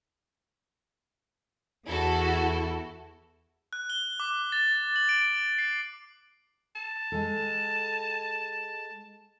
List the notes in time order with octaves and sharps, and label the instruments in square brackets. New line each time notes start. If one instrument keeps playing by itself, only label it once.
[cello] E2 [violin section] E4 F#4 A4
[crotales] F#6
G7
D6
A6
F#7
D7
C7
[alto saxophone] A5
[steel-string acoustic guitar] G#3 A4